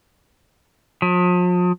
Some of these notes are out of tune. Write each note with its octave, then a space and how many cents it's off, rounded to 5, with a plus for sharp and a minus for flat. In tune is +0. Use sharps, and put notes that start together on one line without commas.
F3 +40